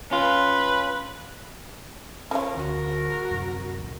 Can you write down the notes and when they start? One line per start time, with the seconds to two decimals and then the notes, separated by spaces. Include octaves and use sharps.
0.11 C#4 F4 B4
2.31 F3 C#4 F4 A#4
2.56 D2 F#4
3.31 F#2 C3
3.79 C#2 A#2